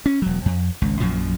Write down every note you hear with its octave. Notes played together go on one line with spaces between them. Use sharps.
C#4
E1 F#3
F2
G#1 C#2
A#1 F#2 A#2 F3